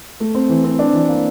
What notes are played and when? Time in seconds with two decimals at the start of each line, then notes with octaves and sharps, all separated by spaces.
0.20 A3
0.35 C4
0.49 E3
0.64 C4
0.79 D4
0.93 E3
1.09 A#3